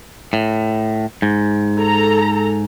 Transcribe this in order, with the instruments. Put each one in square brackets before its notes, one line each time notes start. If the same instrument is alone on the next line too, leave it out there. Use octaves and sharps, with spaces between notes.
[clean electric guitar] A2
G#2
[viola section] A4 A#5